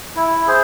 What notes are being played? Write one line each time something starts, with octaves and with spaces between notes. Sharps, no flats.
E4
G#4 C5